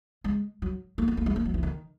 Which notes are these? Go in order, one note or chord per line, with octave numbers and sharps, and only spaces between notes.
G#3
F#3
A#3
B3
A#3
G#3
A#3
F#3
E3
D#3